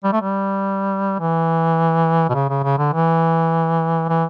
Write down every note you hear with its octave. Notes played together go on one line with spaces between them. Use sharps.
G3
A3
G3
E3
B2
C#3
C#3
C#3
D3
E3
E3